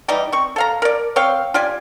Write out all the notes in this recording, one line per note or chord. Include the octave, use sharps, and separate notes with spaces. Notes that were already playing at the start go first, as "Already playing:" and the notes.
E3 G3 D#4 D5
C4 C#6
A4 F5 A#5
A#4 D5
C4 C#5 F5 G5
F4 G4 D5 G#5